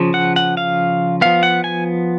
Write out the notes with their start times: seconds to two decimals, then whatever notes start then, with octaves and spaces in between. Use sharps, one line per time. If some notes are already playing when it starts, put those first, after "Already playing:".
Already playing: C#3 F3
0.14 F#5
0.36 F#5
0.57 F5
1.21 F3 B3 F5
1.43 F#5
1.64 G#5